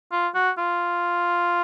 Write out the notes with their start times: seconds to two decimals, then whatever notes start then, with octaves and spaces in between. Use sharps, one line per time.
0.12 F4
0.34 F#4
0.58 F4